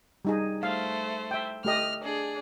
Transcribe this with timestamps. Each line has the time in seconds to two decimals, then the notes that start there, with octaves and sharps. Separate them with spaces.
0.25 G3 D#4 G#4
0.63 A3 C5 F5
1.31 E5 G5
1.65 A3 G4 D#5 F6
2.04 D4 G#4